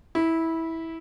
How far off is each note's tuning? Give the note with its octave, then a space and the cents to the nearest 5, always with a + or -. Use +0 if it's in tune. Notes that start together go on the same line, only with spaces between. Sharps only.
E4 -15